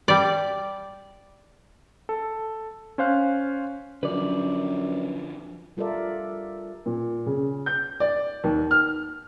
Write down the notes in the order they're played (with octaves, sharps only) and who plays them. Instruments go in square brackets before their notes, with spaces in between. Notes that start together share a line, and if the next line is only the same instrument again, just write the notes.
[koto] G3 D5
[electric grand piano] A4
C#4 C5 F5 F#6
[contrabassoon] F#2 [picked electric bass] D3 F3 [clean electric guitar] B4 D5
[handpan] G3 F4 A4 A#4 D5 E5
[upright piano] A#2
C#3
G6
D5
D#2
F6